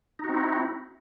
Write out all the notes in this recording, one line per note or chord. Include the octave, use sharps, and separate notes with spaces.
C4 D#4 E4 F#4